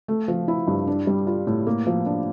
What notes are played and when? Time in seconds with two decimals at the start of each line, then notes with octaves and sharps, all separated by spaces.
0.08 A3
0.28 F3
0.48 E4
0.68 G2
0.87 D4
1.07 G3
1.27 F4
1.47 A2
1.67 A#3
1.87 F3
2.06 D4